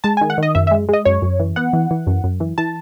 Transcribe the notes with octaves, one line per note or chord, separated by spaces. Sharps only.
G#3 A5
G#5
D#3
F#5
D#3 D#5
F#2 E5
E5
G#3
G#3 D#5
F#2 C#5
F#2
E3
B3 F#5
E3
E3
F#2
F#2
E3
E3 A5